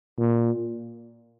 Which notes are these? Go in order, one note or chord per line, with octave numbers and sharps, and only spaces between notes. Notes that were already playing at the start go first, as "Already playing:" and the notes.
A#2